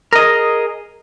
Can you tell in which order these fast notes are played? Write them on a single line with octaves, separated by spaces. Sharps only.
A#4 D#5 G#4